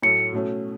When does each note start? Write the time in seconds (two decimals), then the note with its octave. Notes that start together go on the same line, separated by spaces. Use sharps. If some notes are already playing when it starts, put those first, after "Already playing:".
0.02 A2 F#3 A3 C#7
0.33 B2 A3 C#4